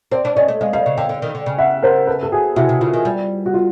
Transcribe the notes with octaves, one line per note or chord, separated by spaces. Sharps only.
C4 C5 D5
D4
C#4 C#5 D#5
A3
G#3 D#5 F5
G3 D#5 F5
C#3
D3 F5 G5
D3
D#3
D3
C#3
E5 F#5
A#4 C5
A4 B4
A4
F#4 G#4
C3 E4 F#4
C3
C#3 F4
D#3
G3
F#4
F4